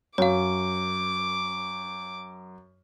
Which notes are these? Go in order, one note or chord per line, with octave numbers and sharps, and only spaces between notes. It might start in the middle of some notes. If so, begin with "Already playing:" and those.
F#2 C#5 F5 D6